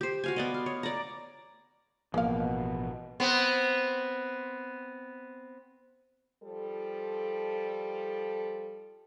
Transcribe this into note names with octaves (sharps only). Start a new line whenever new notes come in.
G4 C5
F#4 F5 G#5
B3 D5 D#5
F5
C#5
D5 A#5
A1 B2 F3 G#3 A#3 F5
B3 C4
F3 G3 A4